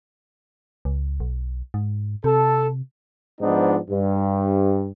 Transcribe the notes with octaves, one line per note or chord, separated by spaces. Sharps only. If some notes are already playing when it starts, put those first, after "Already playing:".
C#2
B1
G#2
C3 A4
G#2 F3 B3 D4 D#4
G2